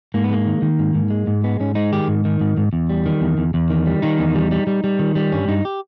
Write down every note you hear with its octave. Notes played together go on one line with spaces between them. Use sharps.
G#2 A#3
B3
G#3 A#3
D#3
D#3
G#2
G#2
G#3
G#2
G#3 B3
G#2 C#4
G#3 D#4
D#3 G4
G#2
D#3
G#2
G#2
E2
G3
D#3
E2
E2
E2
D#3
G3
D#3 D#4
E2
G3
G3
G3
G3
D#3
G3
G2 C#4
G2 D#4
G4